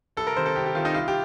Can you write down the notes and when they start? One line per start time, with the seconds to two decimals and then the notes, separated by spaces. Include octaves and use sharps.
0.17 C2 A4
0.27 A#4
0.36 C3 D#3 C5
0.46 A4
0.56 C2 G4
0.66 G4
0.75 C3 D#3 F4
0.85 D#4
0.94 C2 F4
1.08 G4